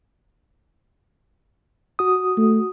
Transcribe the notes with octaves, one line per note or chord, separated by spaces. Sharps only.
F#4 D#6
A3